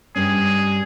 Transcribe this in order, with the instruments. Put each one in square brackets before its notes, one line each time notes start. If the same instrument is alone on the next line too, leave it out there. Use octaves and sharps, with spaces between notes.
[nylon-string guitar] G2 G3 C#4 [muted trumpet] G#4